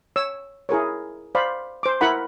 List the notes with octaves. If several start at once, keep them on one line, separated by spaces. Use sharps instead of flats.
C#5 E6
E4 G#4 A#4 C#5
C5 D5 F5 B5
C5 D6
E4 A#4 F#5 B5